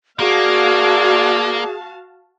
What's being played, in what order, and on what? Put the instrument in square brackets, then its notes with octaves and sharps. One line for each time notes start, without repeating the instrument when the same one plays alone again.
[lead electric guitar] A#3 [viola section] F#4 F5 A5 [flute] G#4 [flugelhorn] D5